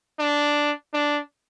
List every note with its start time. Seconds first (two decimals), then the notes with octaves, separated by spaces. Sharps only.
0.19 D4
0.93 D4